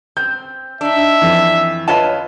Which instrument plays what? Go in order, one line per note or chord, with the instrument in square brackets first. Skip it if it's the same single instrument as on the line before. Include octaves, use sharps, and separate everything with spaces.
[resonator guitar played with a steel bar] C4 [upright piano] G6
[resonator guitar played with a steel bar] D4 D#4 [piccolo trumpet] E5
[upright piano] F2 E3
[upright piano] F4 B4 F5 [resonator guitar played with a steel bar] C#5 D#5 A5